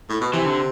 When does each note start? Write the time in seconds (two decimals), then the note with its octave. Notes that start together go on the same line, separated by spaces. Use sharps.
0.09 A2
0.21 B2
0.32 C3 E3
0.46 D3